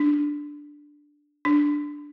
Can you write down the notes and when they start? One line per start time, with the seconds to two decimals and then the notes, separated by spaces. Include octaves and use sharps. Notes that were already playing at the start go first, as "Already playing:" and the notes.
Already playing: D4
1.45 D4